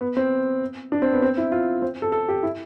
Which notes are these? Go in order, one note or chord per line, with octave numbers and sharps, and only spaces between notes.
B3
C4
D4
C4
B3
C4
E4
F4
C4
A4
A4
G4
E4